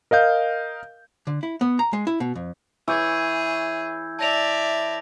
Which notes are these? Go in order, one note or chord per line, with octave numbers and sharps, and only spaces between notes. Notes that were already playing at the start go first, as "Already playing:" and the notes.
A#4 D#5 F5 G6
D3
E4
B3
A#5
G#3
E4
B2
F2
E3 G#4 C#5 D6 E6 G6 G#6
D5 E5 A5 A#6 F7